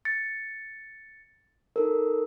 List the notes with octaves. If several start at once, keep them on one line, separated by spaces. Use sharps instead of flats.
A6 C#7
D#4 A4 A#4